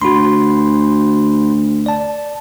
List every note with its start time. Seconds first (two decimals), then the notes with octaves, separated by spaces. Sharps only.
0.02 D2 F#4 B5 C6
1.86 D5 A5